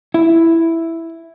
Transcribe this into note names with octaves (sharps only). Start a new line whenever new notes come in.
E4